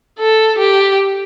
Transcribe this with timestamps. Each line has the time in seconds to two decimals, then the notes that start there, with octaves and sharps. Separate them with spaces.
0.19 A4
0.58 G4